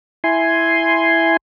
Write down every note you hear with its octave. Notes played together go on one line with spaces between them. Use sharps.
E4 G#5 C6